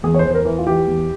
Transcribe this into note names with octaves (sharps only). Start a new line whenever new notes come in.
E2 G#4
C#5
C5
E2
C5
A#4
E3
F4
E3 G4
E2